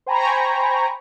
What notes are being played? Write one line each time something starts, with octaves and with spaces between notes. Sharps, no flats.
C5 G5 G#5 A#5 B5 C#6